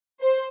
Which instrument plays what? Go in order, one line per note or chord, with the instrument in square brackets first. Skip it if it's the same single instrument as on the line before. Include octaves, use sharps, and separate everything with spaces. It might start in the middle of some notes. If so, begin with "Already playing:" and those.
[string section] C5